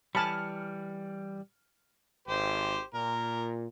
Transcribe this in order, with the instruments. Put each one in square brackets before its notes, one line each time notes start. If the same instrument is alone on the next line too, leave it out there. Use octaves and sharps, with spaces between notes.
[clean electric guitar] E3 G3 [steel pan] G#5 A5 B5 [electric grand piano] F6 C#7
[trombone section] G#1 [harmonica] G4 C5
[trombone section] A#2 [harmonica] A#4